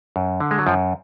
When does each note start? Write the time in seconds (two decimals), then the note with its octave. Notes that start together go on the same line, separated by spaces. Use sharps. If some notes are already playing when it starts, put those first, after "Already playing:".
0.16 F#2
0.40 D3
0.51 G#3
0.58 F#3
0.67 F#2 F3